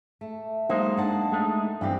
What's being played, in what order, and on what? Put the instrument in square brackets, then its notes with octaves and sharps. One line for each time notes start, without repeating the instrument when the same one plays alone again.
[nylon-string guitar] A3
[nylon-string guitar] F#3 C5 [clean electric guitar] G#3 A#3 D#4
[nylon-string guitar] D4 F#5 A5
[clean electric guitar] G#3 A3 D#4
[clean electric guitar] G2 C4 [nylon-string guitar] E3 D4 G4